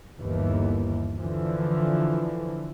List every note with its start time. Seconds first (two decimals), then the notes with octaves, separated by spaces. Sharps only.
0.20 G1 D#2 E3
1.16 D3 E3 F3